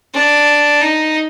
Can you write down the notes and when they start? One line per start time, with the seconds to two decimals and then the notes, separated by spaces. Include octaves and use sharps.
0.14 D4
0.81 D#4